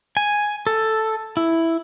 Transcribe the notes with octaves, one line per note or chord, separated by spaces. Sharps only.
G#5
A4
E4